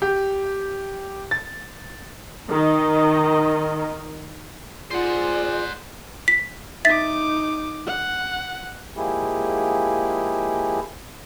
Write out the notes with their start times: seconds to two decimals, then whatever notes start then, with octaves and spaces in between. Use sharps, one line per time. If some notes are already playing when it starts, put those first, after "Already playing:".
0.02 G4
1.31 A6
2.51 D#3 D#5
4.91 F4 G#4 C5 D5 F#5
6.28 B6
6.85 D#4 E5 D6 A6 B6
7.87 F#5
8.97 F3 G#3 A#3 E4 G4 G#4